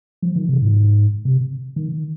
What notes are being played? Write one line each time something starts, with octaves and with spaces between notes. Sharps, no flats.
F3
D#3
C3
G#2
C3
D#3